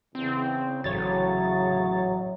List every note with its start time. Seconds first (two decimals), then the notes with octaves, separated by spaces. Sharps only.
0.15 E2 C#3 C4
0.84 A1 A2 F#3 C#5 A6